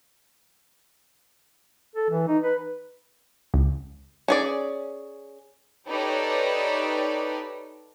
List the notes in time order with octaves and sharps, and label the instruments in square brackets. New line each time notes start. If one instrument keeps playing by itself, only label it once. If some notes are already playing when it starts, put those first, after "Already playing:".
[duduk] A4
E3
D#4
B4
[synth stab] C#2
[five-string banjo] C#4 G#4 D5
[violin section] D#4 G4 A4 B4 C#5 D5